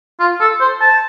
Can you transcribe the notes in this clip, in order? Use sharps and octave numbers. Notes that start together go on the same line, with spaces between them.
F4
A4
C5
A5